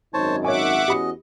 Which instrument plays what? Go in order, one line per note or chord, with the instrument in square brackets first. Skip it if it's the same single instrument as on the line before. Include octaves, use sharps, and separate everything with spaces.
[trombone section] G#1 F#2 D#4 [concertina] C5 C#5 A5
[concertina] F#4 [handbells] C#5 G#5 [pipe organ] E5 F#5 D6
[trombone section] E2 C#4 F#4 [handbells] G4 B5 C#7 [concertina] D#5